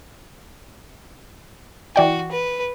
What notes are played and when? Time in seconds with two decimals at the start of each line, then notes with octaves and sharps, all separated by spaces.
1.96 E3 F#4 D5 G5
2.31 B4